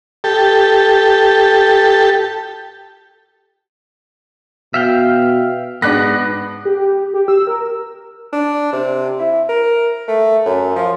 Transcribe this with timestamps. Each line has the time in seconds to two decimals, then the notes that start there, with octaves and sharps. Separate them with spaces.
0.24 G4 A4
4.74 B2 E5 F5 G5
5.82 G#2 B3 D4 F#6 A#6
6.65 G4
6.80 G4
7.14 G4
7.28 E6
7.47 A#4
8.33 D4
8.73 C3
9.19 E4
9.49 A#4
10.08 A3
10.45 F#2
10.76 F3